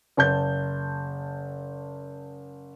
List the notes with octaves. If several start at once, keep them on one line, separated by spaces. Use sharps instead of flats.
F#1 A5 G6